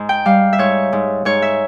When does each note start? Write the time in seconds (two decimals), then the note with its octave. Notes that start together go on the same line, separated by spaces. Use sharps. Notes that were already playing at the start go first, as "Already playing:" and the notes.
Already playing: G#2
0.09 G5
0.25 G3 F5
0.53 E5
0.58 G#2 C#5
0.93 G#2
1.25 G#2 C#5
1.42 E5